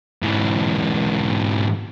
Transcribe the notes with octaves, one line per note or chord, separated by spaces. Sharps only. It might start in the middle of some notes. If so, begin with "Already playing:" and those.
G#2 E3